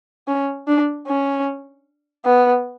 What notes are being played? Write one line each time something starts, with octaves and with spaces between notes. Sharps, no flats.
C#4
D4
C#4
B3